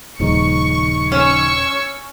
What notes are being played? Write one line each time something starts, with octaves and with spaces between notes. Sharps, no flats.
D#1 C#3 F3 D#4 C#6
C#4 C#6 E6 G#6